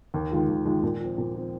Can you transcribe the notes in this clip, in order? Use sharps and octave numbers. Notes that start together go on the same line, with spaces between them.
D#2
D#3 G#3 F4
D#2
D#3 G#3 F4
A#2
F3 C4
A#2
F3 C4